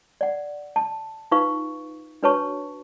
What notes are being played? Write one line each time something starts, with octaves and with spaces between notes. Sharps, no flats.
D5 F#5
A5
D#4 F4 B4 F5 C#6
D4 F#4 B4 C#5 A5 C#6